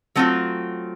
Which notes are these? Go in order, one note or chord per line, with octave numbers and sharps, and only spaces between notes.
F#3 A3 C4 F4